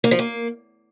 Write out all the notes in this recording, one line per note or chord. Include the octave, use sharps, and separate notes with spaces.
A#3
F3
A#3